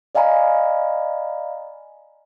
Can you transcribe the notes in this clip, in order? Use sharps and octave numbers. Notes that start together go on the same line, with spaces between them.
D5 D#5 F5 G#5 A#5 B5